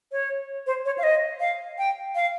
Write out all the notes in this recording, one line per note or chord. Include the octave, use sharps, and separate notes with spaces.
C#5
C5
C#5
F5
D#5
F5
G5
F5